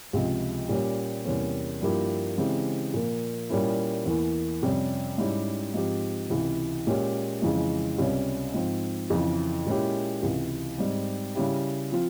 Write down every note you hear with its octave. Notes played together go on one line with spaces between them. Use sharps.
C#2 C3 F3 G#3
A#2 G3 C#4 G4
E2 C3 G3 A#3 C#4
G2 F3 A#3 E4 G4
C#3 E3 G#3 C4 G4
A#2 F3 A#3
A#2 G3 A#3 C#4 E4
E2 E3 A#3
F2 C3 G3 C#4 G4
G#2 G3 C#4 E4 G4
G#2 F3 C4 G4
C#2 C3 E3
A#2 G#3 C#4 G4
F2 C#3 E3 G#3
C#2 C3 G3 C#4
G#2 F3 C4
F2 C#3 E3
A#2 G#3 C#4 E4 G4
C#2 C3 E3
G#2 G3 C4
C#3 G3 C#4 E4 G4
F3 C4 F4